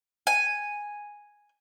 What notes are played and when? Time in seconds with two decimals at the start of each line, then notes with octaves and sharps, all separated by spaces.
0.27 G#5